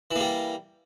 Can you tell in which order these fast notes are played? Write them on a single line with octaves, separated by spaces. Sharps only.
E3 A#3 G3